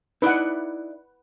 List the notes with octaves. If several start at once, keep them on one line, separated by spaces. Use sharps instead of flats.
D#4 E4 B4 D5 F#5